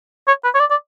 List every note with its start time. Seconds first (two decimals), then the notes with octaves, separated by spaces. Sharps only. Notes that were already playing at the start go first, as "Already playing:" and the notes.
0.28 C#5
0.44 B4
0.55 C#5
0.60 D5
0.70 D5